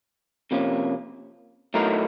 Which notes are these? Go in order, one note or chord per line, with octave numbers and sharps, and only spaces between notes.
C3 F3 A#3 C#4
A2 F#3 A3 D#4 A#4